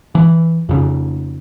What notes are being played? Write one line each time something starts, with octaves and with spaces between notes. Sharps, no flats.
E3
F2 C#3